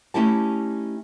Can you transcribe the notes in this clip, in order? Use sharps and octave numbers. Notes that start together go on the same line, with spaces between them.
A3 C#4 D#4 E4 G4 A5